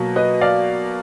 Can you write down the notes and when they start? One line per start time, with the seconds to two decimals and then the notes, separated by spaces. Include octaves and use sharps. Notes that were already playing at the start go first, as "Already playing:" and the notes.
Already playing: B2 F#3 A#3
0.16 B4 D#5
0.41 D5 F5